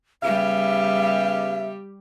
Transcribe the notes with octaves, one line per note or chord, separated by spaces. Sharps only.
C#3 G3 B3 G4 E5 F5